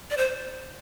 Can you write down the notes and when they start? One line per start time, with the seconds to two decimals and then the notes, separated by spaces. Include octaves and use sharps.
0.10 D5
0.17 C5